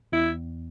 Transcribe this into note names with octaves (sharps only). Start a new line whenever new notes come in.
E2 E4